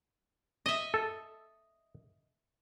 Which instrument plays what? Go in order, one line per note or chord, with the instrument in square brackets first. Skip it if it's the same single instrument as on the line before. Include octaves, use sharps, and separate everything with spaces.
[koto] D#5 E5
[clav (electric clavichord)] A4